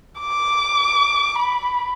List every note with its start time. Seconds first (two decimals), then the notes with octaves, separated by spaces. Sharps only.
0.20 D6
1.39 B5